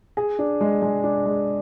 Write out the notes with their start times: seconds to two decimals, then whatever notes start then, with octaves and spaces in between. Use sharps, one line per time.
0.17 G#4
0.39 D4
0.61 G#3
0.82 G#3
1.04 D4
1.26 G#3